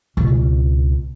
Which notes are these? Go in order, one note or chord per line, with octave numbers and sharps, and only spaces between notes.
C#2 B2